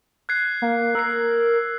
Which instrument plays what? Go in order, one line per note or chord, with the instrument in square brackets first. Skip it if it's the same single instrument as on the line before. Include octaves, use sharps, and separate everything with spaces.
[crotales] F#6 G#6 C7
[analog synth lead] A#3
[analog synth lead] A#4 [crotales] E6 C7